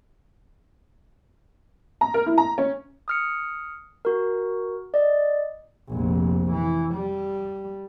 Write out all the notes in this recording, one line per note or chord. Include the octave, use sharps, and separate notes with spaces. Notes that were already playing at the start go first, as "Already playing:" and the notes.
A#5
A#4
E4
A#5
C#4
D#6 F6 C#7
F#4 A#4
D5 D#5
F1 A#1
E3
G3